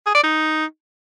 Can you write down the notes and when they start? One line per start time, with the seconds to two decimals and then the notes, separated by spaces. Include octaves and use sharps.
0.06 G#4
0.15 D5
0.23 D#4